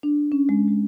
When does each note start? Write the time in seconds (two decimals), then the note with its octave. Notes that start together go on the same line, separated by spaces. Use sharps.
0.03 D4
0.32 C#4
0.49 G#3
0.68 G#3